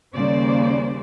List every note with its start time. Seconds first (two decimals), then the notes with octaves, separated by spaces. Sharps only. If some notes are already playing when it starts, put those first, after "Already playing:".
0.15 D#2 C#3 G3 A#3 C5 D5